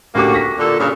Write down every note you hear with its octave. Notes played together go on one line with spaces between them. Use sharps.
A1 D3 A#3 F#4 G4 D6
C#6 A#6 B6
A#2 D3 A4
G2 A#2 C#3